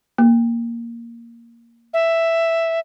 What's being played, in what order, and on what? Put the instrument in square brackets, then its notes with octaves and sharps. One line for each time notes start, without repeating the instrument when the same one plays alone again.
[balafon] A#3
[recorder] E5